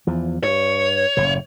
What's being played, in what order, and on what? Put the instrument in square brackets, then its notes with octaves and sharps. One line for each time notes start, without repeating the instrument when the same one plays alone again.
[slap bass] E2 F3
[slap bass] G2 [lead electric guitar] C#5
[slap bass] F#1 A2 C#3